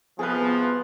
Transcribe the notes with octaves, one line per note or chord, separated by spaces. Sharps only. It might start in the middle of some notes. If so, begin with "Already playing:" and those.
C2 F3 B3 G#4 B4